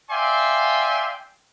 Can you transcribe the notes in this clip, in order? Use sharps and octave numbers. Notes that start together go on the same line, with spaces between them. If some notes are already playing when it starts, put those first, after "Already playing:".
D5 E5 F5 G5 G#5 C6